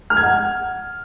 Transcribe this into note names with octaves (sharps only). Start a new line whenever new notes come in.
F6
G#6
F#5